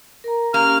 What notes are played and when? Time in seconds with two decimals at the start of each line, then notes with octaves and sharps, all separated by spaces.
0.24 A#4 A#5
0.54 A#3 C#4 G4 F6